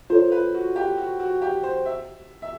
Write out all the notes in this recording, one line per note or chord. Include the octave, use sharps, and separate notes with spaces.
F4 A4 C5 C#5
B4
F#4
G4
F#4
F#4
G4
C5
E5
E5